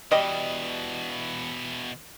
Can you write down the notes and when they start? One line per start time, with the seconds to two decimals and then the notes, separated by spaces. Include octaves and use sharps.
0.11 B2 E3 G3 D#5